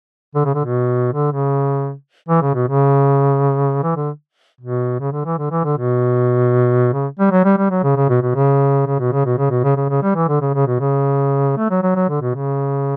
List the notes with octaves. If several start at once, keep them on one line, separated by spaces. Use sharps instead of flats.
D3
C#3
D3
B2
D3
C#3
E3
C#3
B2
C#3
E3
D3
B2
C#3
D3
E3
D3
E3
D3
B2
C#3
G3
F#3
G3
G3
F#3
C#3
C#3
B2
B2
C#3
C#3
B2
C#3
B2
C#3
B2
C#3
C#3
C#3
G3
E3
D3
C#3
C#3
B2
C#3
A3
F#3
F#3
F#3
D3
B2
C#3